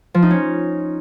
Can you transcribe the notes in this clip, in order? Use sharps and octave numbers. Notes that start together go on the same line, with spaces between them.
F3
D#4
C#4